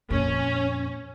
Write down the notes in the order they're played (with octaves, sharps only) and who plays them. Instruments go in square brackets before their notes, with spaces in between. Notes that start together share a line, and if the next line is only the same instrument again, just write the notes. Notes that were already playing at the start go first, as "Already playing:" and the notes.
[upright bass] F2 A#2 [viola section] C#4